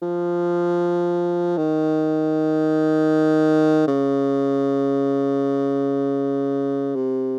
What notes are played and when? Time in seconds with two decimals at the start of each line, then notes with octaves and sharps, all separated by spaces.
0.02 F3
1.57 D#3
3.88 C#3
6.95 C3